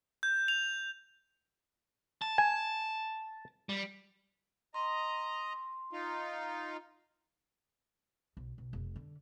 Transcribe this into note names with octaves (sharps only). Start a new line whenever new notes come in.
G6
F7
A5
G#5
G3
D#5 A#5 C6
D#4 F4
B1
B1
F1
D3